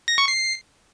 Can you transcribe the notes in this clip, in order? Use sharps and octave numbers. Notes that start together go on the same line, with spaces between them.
A#6
C#6
C7